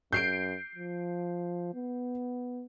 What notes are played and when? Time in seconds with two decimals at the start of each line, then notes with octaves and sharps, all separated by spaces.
0.13 F#2 G6 C7 D7
0.75 F3
1.75 B3